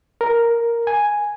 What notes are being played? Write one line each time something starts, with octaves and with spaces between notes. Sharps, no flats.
A#4
G#5